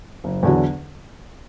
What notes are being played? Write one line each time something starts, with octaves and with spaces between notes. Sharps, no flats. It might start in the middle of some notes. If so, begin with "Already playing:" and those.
F#1
E2 D3 F#3